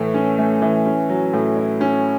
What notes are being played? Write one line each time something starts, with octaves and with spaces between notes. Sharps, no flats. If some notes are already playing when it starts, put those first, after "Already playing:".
Already playing: A2 E3 A3
C#4
A3
E3
C#4
F#3
A2
E4
C#4